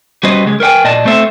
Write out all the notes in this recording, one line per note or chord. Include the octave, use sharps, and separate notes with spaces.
G3 C#4 F#4 B4 C5 D#5
C#2 G#3
A#4 B4 C#5 G5 G#5
A#2 D5 D#5 A5
A3 C4 A4 C5 E5